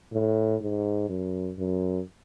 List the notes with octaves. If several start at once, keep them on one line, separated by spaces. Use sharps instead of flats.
A2
G#2
F#2
F#2